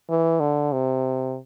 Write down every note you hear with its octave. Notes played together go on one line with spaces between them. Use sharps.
E3
D3
C3